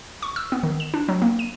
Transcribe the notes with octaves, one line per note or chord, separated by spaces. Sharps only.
C#6
E6
B3
D#3
E7
D4
F#3
A#3
D#7